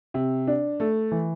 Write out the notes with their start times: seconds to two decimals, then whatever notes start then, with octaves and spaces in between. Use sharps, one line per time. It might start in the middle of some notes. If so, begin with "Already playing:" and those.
0.14 C3
0.47 D4
0.80 A3
1.12 E3